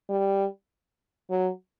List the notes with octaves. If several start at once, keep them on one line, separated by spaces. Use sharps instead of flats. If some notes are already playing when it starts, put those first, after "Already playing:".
G3
F#3